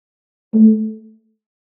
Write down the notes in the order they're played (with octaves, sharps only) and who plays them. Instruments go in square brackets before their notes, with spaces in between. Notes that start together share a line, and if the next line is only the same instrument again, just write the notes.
[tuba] A3